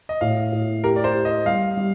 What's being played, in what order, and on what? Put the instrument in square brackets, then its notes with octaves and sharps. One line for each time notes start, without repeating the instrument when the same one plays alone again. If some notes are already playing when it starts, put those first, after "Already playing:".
[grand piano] D#5
[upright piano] A2 [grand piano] F5
[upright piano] A2
[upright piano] G4 [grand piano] A#4
[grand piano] D5
C5
[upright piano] G4
[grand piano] D#5
[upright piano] G3 [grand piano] F5
[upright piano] G3